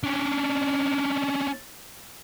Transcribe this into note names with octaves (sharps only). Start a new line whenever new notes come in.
C#4 D4